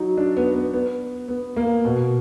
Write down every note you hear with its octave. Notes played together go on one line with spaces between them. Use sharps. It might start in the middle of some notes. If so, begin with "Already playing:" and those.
Already playing: F#3 D#4
D4
B3
B3
B3
B3
A#3
B2